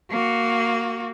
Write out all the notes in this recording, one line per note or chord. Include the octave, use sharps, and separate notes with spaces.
A#3 F#4